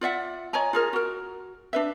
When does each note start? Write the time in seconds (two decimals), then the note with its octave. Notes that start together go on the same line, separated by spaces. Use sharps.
0.01 F4 D5 E5 F#5
0.53 C#5 D#5 G#5 A#5
0.73 F4 G#4 A#4
0.93 F#4 A#4
1.73 D4 B4 E5